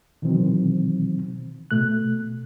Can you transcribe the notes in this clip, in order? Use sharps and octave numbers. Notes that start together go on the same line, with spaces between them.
B2 D#3 E3 F#3 C4
B2 A3 F#6